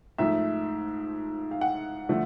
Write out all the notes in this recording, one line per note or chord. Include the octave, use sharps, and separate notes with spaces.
G#2 F3 A3 E5
F5
F#5
D3 F3 A3